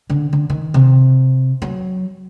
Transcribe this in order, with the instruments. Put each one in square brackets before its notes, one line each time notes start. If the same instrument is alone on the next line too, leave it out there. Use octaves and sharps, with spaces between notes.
[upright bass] D3
D3
D#3
C3
F#3